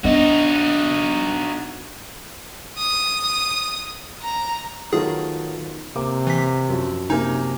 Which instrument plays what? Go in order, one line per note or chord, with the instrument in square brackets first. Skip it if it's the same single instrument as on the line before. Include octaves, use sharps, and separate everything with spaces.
[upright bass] B3 [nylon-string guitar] D4 D#5 E5 [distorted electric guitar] D#4 F#4
[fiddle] D#6
A#5
[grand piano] D#3 B3 F4 [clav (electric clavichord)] F#3 A3 A#4 [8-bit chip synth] G#4
[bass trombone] C3 [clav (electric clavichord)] A#3 [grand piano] D6
[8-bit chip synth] E3 B6
[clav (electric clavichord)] F#2 F3
[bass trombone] C3 [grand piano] A#3 G#5 [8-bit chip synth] D#4